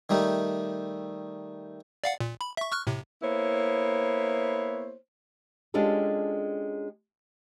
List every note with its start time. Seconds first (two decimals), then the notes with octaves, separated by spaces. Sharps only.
0.09 D#3 G3 A3 D#4
2.04 D5 F5 F#5
2.20 A#2
2.41 B5
2.57 E5 C#6
2.71 C#6 F6 F#6
2.87 A2 C3
3.23 A#3 B3 E4 C5 C#5
5.74 G#3 C#4 D4 F4 G4 A4